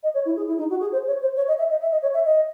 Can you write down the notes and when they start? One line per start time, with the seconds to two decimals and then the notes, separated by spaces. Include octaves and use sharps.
0.03 D#5
0.14 C#5
0.26 E4
0.36 G#4
0.47 E4
0.58 D#4
0.70 F#4
0.81 G#4
0.92 C5
1.07 C#5
1.21 C5
1.36 C#5
1.48 D#5
1.58 E5
1.70 D#5
1.81 E5
1.91 D#5
2.02 C#5
2.14 E5
2.25 D#5